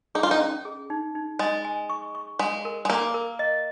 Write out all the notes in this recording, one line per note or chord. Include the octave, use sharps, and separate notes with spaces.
D#4 G#4
F4
D#4
C#4
G#4
D#4
D#4
G#3 D#5
G#5
C#6
C#6
G#3 F5
A#4
G#3
A#3 A#4
A#4
D#5